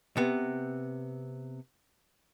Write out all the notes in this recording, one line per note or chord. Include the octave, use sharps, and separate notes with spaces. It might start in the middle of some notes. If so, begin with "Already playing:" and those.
C3 B3